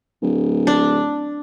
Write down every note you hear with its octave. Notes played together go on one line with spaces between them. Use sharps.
D1
D4